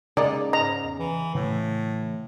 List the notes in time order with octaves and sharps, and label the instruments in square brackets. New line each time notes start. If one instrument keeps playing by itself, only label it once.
[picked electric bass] C#3 [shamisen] G#3 A#3 D#4 [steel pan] D5
[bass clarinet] G#2 [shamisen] D#5 [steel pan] A#5
[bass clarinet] E2
E3
[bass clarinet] A2 [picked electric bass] C#3 E3 A3